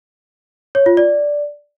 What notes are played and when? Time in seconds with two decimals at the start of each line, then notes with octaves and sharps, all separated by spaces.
0.75 C#5
0.86 F4
0.97 D5